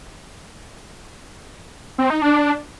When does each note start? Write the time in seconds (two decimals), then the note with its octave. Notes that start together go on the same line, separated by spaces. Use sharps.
1.98 C4
2.10 D#4
2.22 D4